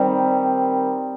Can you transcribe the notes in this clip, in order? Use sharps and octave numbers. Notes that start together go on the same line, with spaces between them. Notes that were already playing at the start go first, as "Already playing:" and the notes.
Already playing: D#3 G3 C4